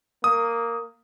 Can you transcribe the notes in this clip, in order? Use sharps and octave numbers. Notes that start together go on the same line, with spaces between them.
A#3 D#6